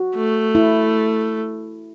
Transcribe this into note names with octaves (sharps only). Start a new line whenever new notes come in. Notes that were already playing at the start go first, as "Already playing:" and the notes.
Already playing: F#4
A3
E4